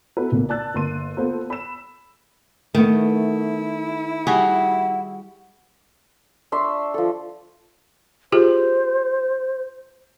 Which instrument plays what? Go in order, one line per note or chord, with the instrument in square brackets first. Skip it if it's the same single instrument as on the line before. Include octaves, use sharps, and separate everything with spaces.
[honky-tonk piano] B3 E4 F#4 A4 B4
B1 A#2 A#3
D5 A5 E6 F#6 A6
G1 A#3 C6 D#7
A#3 B3 F4 A4 C5
B5 E6 E7
[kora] D#3 [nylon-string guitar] A3 B3 [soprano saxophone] E4
[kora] G3 F#4 G#4 [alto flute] F#5
[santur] D4 E5 C6 C#6
F3 A4
[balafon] F4 G4 G#4 [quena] C5